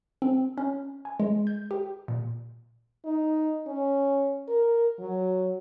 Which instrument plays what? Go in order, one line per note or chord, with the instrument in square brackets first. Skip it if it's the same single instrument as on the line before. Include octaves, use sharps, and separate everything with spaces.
[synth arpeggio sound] C4
C#4
G#5
G#3
G6
G4
A#2
[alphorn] D#4
C#4
A#4
F#3